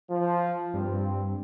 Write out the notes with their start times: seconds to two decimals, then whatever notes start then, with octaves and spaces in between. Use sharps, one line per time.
0.10 F3
0.74 G2 C4